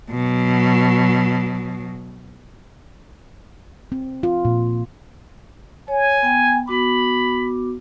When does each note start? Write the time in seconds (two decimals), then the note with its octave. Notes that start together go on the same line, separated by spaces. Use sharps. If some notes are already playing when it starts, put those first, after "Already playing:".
0.11 B2 F#3
3.92 C4
4.23 F4
4.45 A#2
5.88 C#5 G#5
6.23 B3 G5
6.68 B3 F#4 B5 D6